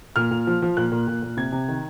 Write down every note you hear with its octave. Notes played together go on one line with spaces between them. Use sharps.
A#2 F6
A#2
F3
F3
A#2 F#6
A#2
A#2
A#2
C3 G#6
C3
D#3